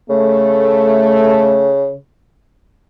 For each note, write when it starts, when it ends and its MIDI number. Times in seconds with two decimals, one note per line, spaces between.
0.10 1.94 49
0.10 1.79 57